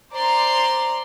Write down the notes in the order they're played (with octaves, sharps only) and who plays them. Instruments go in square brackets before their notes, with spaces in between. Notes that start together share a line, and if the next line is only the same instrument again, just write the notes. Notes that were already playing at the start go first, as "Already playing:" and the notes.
[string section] C5 D5 A#5 C6